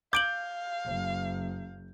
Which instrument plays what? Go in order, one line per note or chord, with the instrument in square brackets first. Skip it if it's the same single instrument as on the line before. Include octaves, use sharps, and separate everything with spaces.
[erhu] F5 [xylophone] D6 D7 F#7 [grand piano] G6
[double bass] F#1